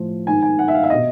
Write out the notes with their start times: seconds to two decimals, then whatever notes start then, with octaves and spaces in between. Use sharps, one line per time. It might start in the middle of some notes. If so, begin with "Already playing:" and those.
Already playing: A2 F3
0.27 G#2 D#3 G#5
0.42 G#5
0.59 F#5
0.68 E5
0.74 F5
0.83 E5
0.90 B2 D#5